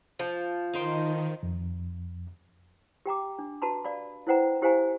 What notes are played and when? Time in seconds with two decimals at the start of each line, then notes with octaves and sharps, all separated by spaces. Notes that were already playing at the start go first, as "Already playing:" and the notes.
0.19 F3
0.73 D#3 D#4 C5 G5
1.43 F2
3.06 G4 G5 A#5 D6
3.39 D4
3.62 F#4 B4 A5 A#5 C6
3.84 D5 F5 B5
4.27 E4 B4 C5 F#5 G5 A#5
4.62 E4 G4 C5 F5 G#5 A#5